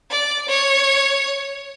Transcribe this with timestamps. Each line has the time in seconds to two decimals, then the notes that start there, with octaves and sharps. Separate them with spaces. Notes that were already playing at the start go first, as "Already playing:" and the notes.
0.11 D5
0.48 C#5